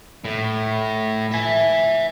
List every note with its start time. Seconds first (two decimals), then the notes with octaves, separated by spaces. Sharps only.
0.25 A2
1.31 E5 G#5